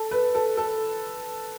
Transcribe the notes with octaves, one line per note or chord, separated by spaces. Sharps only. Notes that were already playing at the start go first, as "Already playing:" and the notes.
Already playing: A4
B4
A4
A4